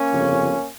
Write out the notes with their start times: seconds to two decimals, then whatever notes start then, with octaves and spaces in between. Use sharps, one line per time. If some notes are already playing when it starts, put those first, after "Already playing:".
Already playing: A#3 C#4
0.11 G1 F2 C#3 F3